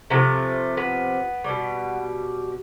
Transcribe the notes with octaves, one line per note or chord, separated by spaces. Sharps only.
C3 F3 A3 B3
B3
B2 G3